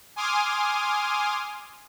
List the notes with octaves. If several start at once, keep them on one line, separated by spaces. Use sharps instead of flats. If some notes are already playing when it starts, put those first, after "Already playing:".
G#5 C6 D6 D#6 F6